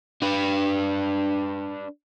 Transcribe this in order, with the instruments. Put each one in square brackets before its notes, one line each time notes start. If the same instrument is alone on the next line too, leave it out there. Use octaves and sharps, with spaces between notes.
[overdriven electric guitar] D4 B4